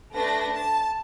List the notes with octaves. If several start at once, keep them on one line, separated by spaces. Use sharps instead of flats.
A3 D4 B4 A#6
A5